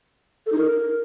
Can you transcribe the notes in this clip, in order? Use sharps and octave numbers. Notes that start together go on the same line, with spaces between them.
A4
D#4
A#4